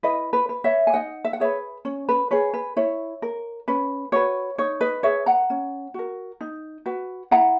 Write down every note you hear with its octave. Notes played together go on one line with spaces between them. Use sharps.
E4 B4 D#5
B4
B4
C#5 E5
G#5
D#4 D#5 F#5
E5
F#5
G#4 B4 C#5 E5
C#4 C#5
B4
G#4 B4 C#5
B4
E4 C#5
A#4
C#4 B4
F#4 B4 C#5
D#4 C#5
B4 D#5
G#4 B4 C#5 E5
F#5 A#5
C#4
F#4 A#4
D#4
F#4 B4
E4 F#5 A#5